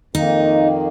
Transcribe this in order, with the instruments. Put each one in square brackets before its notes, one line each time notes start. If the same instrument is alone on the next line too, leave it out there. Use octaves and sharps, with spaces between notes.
[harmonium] F2 D#3 A#3 [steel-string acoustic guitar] D#4